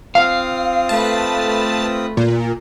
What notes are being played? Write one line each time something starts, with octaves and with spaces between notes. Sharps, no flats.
C4 F4 F5 D#6
A3 B4 A5
A#2